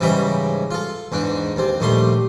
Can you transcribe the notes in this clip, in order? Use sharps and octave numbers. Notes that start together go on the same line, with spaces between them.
G#2 C#3 E3 G3 E5 A#5
F4 A4
E2 G#2 D4
D#2 C4
A#1 D#2 G3 A3 C6